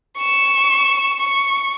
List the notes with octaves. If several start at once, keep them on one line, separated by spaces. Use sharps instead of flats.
C#6 E7
C#6